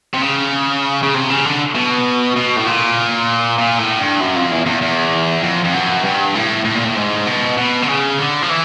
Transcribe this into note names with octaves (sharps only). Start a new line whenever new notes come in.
C3
C#3
C#3
C3
C#3
D3
B2
B2
A2
A#2
A#2
A2
G2
F#2
F2
E2
E2
E2
F2
F2
F#2
G2
A2
A2
A#2
A2
G#2
B2
B2
D3
C#3
D3
F3
E3